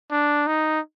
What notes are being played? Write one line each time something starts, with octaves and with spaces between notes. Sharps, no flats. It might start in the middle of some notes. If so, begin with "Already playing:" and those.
D4
D#4